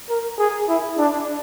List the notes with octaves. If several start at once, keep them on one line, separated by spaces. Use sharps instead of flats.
A#4
G#4
E4
D4